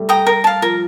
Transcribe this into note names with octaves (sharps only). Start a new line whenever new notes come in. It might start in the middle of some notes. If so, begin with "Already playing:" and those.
Already playing: G3 A3
G5 A#5 D#6
A#4
F5 A5
F3 A#4